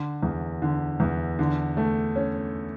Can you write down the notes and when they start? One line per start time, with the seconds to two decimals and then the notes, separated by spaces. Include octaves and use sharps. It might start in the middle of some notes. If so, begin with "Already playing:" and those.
Already playing: D3
0.23 E2
0.62 D3
1.00 E2
1.39 D3
1.77 A3
2.16 C#4